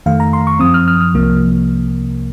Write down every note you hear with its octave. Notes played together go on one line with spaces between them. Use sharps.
F2 D#3 A3 F5
A#5
C6
C#6
F#2 F3 C4 D#6
F6
F6
F6
C2 C3 F3 A#3